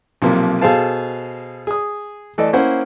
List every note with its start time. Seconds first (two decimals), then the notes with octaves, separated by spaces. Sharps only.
0.22 B1 C3 F3 A#3
0.61 B2 G#4 A4 C5 F5 A5
1.67 G#4 D#6
2.38 E3 A3 A4 D5 D#5
2.53 A#3 C#4 E4 C5 F#5